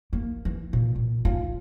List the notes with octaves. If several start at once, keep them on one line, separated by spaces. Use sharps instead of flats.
A#3
E3
A#2
A#2
F4